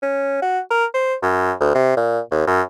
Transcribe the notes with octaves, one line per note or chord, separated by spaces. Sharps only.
C#4
F#4
A#4
C5
F#2
D2
C3
A#2
D#2
F#2